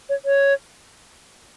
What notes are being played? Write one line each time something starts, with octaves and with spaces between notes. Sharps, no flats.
C#5
C#5